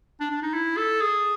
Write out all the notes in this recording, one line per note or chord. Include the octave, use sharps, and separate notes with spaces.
D4
D4
D#4
E4
A4
G#4